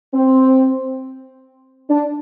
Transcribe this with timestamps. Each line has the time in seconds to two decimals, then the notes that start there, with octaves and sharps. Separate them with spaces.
0.14 C4
1.90 D4